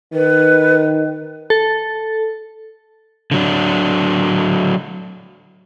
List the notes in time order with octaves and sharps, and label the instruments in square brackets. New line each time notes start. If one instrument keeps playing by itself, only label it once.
[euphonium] D#3 [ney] B4
[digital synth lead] A4
[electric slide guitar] D3 F#3 D4